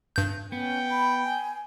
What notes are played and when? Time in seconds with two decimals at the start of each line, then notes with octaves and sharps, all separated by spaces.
0.16 G2 G6
0.52 B3 C#4 G5
0.90 B5
1.24 G#5